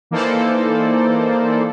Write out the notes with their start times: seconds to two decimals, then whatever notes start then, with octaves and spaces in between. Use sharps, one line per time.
0.11 E3 A#3 D#4 A4 C5 D5